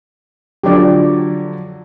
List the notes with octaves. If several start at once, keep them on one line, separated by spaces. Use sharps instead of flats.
D3 F3 F#3 G4 D5